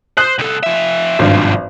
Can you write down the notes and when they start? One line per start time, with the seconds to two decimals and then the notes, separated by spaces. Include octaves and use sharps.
0.17 C5 D#6 F#6
0.39 C2 A4
0.63 F3 E5
1.19 G#1 G2 B2 F3